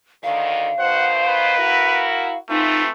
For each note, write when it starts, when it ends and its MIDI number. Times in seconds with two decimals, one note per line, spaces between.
0.23 0.69 38
0.23 0.69 50
0.23 0.69 51
0.23 2.38 77
0.79 1.58 47
0.79 1.58 51
0.79 1.58 72
0.79 1.10 78
1.26 2.05 71
1.58 2.35 64
1.58 2.35 66
1.58 2.35 70
2.49 2.86 52
2.49 2.90 57
2.49 2.86 60
2.49 2.82 63
2.49 2.86 65